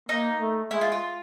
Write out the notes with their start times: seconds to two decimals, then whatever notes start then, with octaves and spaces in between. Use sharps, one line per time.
0.09 A#3 D#4
0.40 A3
0.71 G#3 E4
0.81 F4
0.92 F4